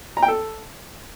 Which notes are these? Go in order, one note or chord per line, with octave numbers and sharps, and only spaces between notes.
A#5
G5
A4